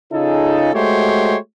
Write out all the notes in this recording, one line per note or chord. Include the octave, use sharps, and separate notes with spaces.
C#3 D#4 F4 G#4 A4
G#3 A3 F#4 G4 C5 C#5